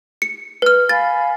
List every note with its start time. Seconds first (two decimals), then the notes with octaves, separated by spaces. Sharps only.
0.22 C#7
0.62 B4 F6
0.89 F5 G#5 B5 A6